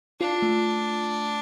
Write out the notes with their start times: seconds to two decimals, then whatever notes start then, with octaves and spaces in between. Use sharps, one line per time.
0.21 D4 F4
0.42 A3